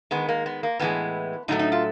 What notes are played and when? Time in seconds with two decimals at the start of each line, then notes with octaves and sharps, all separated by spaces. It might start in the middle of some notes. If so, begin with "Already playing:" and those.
0.11 D#3 G#3 B3
0.29 A#3
0.46 B3
0.63 A#3
0.79 A2 E3 G#3 B3
1.48 A2 F#3 A3 D#4
1.59 D#4
1.72 F4